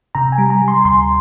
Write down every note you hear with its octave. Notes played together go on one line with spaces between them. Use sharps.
C3 A#5
G#5
G3
A#5
G3
C6
D2 C6